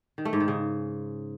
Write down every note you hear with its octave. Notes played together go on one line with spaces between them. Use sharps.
D#3
A3
G#2
D#3
C#3